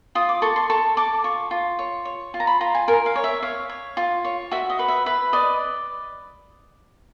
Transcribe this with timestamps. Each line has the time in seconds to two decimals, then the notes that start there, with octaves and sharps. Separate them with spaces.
0.15 F4 D#6
0.29 D6
0.42 A4 C#6
0.56 C6
0.70 A4 C#6
0.97 A4 D6
1.24 F4 C#6
1.51 F4
1.79 C#5
2.05 C#5
2.34 F4
2.40 A#5
2.47 B5
2.61 F4 A#5
2.75 G#5
2.88 A#4 G#5
3.06 F5
3.16 C#5
3.24 E5
3.43 C#5 F5
3.69 C#5
3.97 F4
4.25 C#5
4.51 F#4 E5
4.70 D#5
4.79 B4
4.88 E5
5.06 B4 E5
5.33 D5 D#5